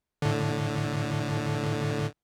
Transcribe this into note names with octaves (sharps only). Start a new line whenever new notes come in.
A2 D3